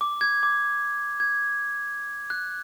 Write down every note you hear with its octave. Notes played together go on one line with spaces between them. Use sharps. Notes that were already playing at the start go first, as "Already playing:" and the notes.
D6
G#6
D6
G#6
F#6